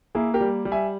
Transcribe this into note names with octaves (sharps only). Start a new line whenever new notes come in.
A#3 E4 G#4
G4 A#4
G3
G3
E5 G#5